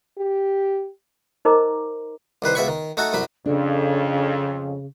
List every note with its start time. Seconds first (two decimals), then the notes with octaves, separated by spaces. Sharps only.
0.18 G4
1.45 D#4 A#4 C5 D#5 A#5 D6
2.42 C2 D#3 B4 C5
2.55 C#2 B2 E5 G#5 B5 C#6
2.68 D#3
2.97 A3 D#4 F#4 A4
3.13 C2 F#2 F#3 B5
3.46 F2 C#3 D4 A4 C#5